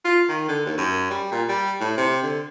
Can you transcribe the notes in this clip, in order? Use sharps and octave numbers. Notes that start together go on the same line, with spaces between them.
F4
D#3
D3
D#2
F#2
G3
A#2
G3
A2
C3
D3